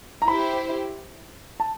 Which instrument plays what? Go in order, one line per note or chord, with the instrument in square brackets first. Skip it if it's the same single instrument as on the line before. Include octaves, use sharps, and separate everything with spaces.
[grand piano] A#5
[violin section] E4 G4 C5 [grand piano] B5
[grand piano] A5